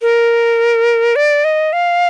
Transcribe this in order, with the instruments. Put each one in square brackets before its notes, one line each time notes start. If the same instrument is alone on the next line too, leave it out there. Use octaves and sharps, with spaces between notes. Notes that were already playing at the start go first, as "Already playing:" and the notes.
[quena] A#4
D5
D#5
F5